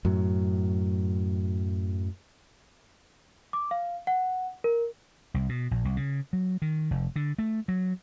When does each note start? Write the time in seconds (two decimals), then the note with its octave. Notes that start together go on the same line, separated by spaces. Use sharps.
0.05 F#2 A2 F#3
3.53 D6
3.71 F5
4.07 F#5
4.64 A#4
5.34 C2
5.49 B2
5.71 A#1
5.85 C2
5.97 C#3
6.33 F#3
6.62 D#3
6.91 F1
7.16 D3
7.38 A3
7.68 F#3